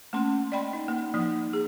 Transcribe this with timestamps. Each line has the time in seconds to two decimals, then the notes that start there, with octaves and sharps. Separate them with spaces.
0.13 A3 A#3 C#4 C6
0.52 D5 D#5 G5 B5 C6
0.73 D#4
0.88 A#3
1.14 F3 A#3 D#4
1.53 G#4